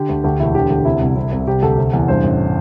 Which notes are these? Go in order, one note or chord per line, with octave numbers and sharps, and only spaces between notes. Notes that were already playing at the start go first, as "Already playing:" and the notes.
Already playing: D3 G4
D2
D2 G4
E1 E4
D3 G4
D2 G4
C3 E4
C2
C3
C2
C3 G4
D2 A4
C3
E2
G2 C5
A1